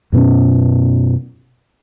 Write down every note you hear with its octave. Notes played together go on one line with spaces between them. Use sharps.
F#2 B2 B3 C#4